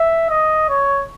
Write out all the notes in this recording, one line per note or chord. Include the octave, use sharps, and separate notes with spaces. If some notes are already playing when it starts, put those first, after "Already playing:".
Already playing: E5
D#5
C#5